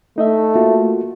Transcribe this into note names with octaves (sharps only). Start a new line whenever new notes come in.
A3 D#4 D#5 E5
A#3 F4 F#4